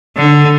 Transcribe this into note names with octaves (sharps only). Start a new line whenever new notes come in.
D3